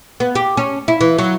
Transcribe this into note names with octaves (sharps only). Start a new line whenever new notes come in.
B3
G4
C#4
E4
E3
F#3